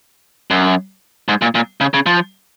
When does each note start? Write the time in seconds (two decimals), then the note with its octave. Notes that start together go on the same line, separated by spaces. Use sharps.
0.51 F#2
1.28 G#2
1.42 A#2
1.55 A#2
1.81 C#3
1.94 C#3
2.06 F3